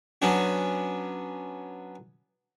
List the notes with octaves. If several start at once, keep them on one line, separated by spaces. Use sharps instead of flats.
F#3 B3 C#4 D4 F#4